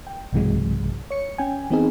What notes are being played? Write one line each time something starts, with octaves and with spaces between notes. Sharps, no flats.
G5
B1 G2 C3 E3 F#3 G#3
C#5 C#7
C#4 G5 G#5
E3 B3 C4 D#4 G#4